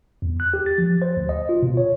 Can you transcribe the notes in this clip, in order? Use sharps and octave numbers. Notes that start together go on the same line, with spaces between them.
E2
F#6
G4
A6
F3
C5
D2
D#5
F4
B2
C#5